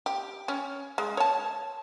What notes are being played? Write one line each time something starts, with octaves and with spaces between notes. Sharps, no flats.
G4
C#4
G#3
C#5 A5